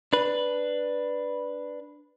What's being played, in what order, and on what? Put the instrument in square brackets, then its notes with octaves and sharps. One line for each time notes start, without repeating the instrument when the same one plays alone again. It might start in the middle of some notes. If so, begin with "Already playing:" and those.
[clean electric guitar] D4 B4